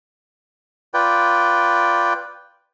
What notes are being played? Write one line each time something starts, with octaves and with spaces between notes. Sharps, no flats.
F4 B4 D5 G5